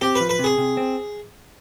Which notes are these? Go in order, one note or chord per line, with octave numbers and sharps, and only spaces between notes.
C4 G4
B4
F3
B4
C3
G#4
C3
C4